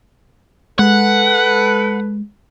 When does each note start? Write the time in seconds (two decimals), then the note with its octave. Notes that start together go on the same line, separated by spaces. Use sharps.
0.79 G#3 A4 B4 F#5